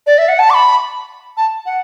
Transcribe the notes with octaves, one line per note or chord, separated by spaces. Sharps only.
D5
E5
F#5
A5
D6
B5
A5
F#5